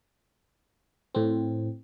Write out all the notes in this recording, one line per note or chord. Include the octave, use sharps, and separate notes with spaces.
A2 C4